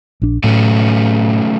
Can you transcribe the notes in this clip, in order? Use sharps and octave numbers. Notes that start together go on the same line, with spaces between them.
A#1 D4
A2 F#3 A3 C#4